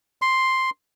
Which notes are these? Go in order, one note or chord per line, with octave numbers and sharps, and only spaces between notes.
C6